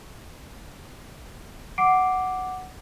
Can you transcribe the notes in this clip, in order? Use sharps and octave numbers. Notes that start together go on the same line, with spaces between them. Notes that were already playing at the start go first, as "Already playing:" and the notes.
F#5 D6 C7 D7